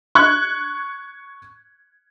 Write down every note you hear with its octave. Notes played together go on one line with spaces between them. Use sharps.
C#6 F#6 G#6